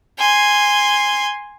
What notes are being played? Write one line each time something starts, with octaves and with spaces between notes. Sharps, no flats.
G#5 C6